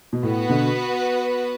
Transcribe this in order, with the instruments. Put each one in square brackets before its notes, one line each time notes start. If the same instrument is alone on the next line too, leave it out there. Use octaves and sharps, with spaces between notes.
[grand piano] B2
[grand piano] A2 [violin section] B3 F#4 B4
[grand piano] B2 D3